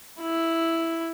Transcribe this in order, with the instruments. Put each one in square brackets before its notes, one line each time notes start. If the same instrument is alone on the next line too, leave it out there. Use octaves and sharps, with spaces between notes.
[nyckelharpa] E4